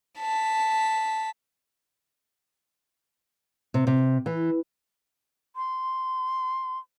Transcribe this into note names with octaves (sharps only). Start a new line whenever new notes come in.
A5 B6
C3
C3
E3
C6